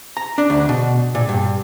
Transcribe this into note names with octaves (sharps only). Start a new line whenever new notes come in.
A#5
D4
D2
B2
A#2
G2